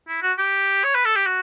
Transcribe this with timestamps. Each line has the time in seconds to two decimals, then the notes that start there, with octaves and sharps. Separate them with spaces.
0.08 E4
0.22 F#4
0.38 G4
0.84 C#5
0.95 B4
1.05 A4
1.16 G4
1.26 F#4